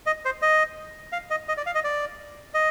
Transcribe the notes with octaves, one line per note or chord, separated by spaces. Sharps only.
D#5
C5
D#5
F5
D#5
D#5
D5
F5
D#5
D5
D#5